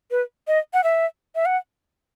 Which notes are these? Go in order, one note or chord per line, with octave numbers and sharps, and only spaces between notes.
B4
D#5
F#5
E5
E5
F#5